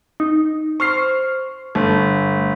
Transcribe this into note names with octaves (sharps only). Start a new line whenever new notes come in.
D#4
C5 C#6 F6 C7
G1 A3